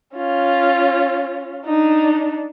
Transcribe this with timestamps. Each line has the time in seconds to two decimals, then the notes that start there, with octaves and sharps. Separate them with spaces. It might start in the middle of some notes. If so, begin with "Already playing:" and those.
0.16 C#4 F4
1.65 D4 D#4